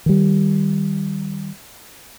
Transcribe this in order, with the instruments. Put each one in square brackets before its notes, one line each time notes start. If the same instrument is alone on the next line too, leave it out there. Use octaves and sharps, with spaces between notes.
[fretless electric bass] D#3 G3